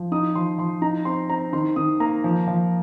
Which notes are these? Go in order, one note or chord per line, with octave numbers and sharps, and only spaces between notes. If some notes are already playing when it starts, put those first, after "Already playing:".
Already playing: F3
D#4 D#6
F3 C6
F3 C6
D#4 A#5
C4 C6
C4 A#5
D#3 C6
D#3 D#6
A#3 A#5
F3
F3